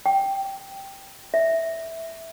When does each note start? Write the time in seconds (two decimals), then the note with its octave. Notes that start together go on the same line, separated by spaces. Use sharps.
0.06 G5
1.34 E5